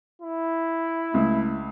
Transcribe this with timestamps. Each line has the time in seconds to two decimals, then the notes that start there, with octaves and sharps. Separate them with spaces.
0.22 E4
1.14 C#2 A3